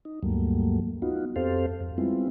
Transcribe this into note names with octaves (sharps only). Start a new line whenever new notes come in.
D#4
D2 G2 F#3 G3 A3 A#3
B3 D#4 F4 F#4
F2 C4 G4 A4 C5 F5
F2
G3 G#3 B3 C4 E4 F4